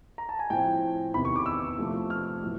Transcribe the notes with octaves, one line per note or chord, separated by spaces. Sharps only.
A#5
A5
G#5
A2 F3 A3 C4 G5
E2 C3 D#3 B5
C#6
D6
E6
C3 F3 A3
F6
A2 F#3 B3